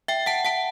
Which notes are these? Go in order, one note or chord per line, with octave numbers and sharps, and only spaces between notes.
E5 G5
F#5 A5
F#5 A5